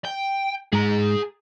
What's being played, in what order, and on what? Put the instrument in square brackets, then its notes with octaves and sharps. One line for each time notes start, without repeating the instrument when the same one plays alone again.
[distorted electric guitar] G5
[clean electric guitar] G#2 [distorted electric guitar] G#4 A#5